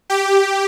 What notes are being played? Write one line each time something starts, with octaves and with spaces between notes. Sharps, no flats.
G4